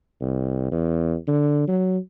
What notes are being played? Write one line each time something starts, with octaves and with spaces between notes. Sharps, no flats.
C2
E2
D3
F#3